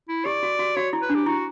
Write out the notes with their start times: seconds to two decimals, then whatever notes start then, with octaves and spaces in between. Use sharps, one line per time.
0.09 E4
0.26 G4 D5
0.43 F#4
0.59 F#4
0.76 F#4 C#5
0.93 E4
1.02 B4
1.10 D4
1.15 G4
1.26 E4 F#4